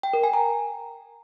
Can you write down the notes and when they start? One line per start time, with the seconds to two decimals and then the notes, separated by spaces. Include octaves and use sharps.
0.03 G5
0.13 A#4
0.23 G#5
0.34 A#5